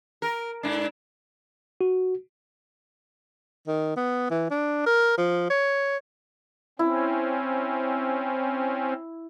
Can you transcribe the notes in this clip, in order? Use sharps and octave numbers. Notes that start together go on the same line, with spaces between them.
A#4
G#2 D4
F#4
D#3
B3
E3
D4
A#4
F3
C#5
C4 C#4 E4